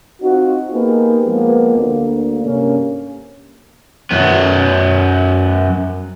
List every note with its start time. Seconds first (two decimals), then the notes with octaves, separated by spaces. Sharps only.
0.21 C4 D#4 F4 F#4
0.73 A#3 B3 D#4 G4 G#4 B4
1.25 F3 G#3 A#3 B3
1.76 D2 D3 A#3
2.43 G2 C3 A#3 C#4
4.11 F#2 B3